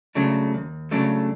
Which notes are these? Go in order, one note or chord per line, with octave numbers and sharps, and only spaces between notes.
C#3 F#3 A3 D4
D#2
C#3 F#3 A3 D4